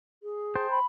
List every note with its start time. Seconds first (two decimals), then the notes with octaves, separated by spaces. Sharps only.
0.23 G#4
0.56 C5 G5 A5
0.70 B5